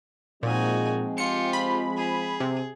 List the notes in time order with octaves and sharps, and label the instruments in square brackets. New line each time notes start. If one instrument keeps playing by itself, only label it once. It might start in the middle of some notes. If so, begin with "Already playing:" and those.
[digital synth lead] A#2 [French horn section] F3 G#3 C4 [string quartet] D#4 F#4 G#5
[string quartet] F4 G4 [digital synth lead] C#7
[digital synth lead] B5
[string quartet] G#4
[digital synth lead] C3